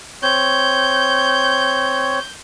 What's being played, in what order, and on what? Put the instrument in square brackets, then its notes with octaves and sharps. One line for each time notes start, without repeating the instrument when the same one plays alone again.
[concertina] C4 C#5 [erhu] G6